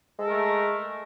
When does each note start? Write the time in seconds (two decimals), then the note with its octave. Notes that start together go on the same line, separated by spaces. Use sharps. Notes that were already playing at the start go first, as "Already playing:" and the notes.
0.18 G#3
0.21 A4
0.25 A#4
0.29 A3